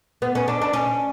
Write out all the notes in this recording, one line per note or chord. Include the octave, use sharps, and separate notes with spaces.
B3
C#4
D4
D4
C#4